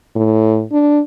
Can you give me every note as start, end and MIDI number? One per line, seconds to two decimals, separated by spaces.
0.16 0.64 45
0.72 1.01 62